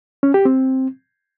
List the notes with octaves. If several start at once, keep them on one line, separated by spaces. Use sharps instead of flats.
C#4
G4
C4